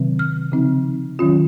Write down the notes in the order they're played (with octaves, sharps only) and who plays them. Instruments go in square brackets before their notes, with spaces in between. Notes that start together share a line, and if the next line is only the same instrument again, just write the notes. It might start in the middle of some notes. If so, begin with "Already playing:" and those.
Already playing: [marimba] C3 D#3 F#3 C4
F6
C#3 F3 C4 D#4
D#3 F#3 C#4 F4